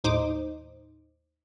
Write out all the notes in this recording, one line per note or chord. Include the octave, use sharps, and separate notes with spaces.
D#2 A2 D#4 C5 D6 D#6